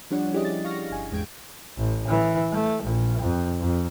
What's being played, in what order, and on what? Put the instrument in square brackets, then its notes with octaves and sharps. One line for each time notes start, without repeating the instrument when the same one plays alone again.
[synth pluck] F3 G3 D4 C#5 F#5
C#4 E4 G4 G#4 D5 D#5
A6
F5 C#6 F6 A#6
G1 G#5
E2 G#2 G#3 G5 G#6 D7
[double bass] A1
E3
A3
A#1
F2
F2